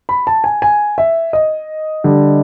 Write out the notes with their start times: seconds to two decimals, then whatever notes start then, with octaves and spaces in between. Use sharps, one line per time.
0.09 B5
0.27 A5
0.44 G#5
0.62 G#5
0.98 E5
1.33 D#5
2.04 D3 G3